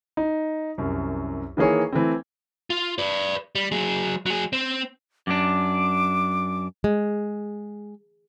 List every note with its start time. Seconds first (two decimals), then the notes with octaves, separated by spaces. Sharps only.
0.17 D#4
0.78 C2 F#2
1.57 D#3 E3 A#3 G#4 C#5
1.92 E3 A3 C4
2.70 F4
2.98 B4 D5
3.55 G3
3.72 F#3 G#4
4.26 F#3 G#4
4.53 C4
5.27 F#2 D4 D6
6.84 G#3